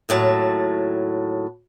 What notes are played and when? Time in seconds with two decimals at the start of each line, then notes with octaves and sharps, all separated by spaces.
0.09 D#2 A2 F#3 A5